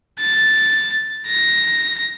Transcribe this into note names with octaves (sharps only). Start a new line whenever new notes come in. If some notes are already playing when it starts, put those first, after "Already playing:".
A6
A#6